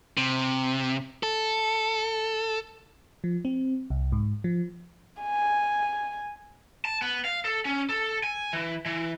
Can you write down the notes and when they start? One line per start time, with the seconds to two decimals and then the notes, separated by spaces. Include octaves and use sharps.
0.17 C3
1.23 A4
3.24 F3
3.45 C4
3.90 C2
4.12 G#2
4.44 F3
5.22 G#5
6.85 A5
7.02 B3
7.25 F5
7.45 A4
7.65 C#4
7.89 A4
8.23 G#5
8.53 E3
8.86 E3